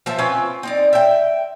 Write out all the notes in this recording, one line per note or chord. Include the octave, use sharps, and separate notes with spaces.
F3 C5 E5 A5
C4 C#4 F4 B4
C4 D#4 D5
E5 G5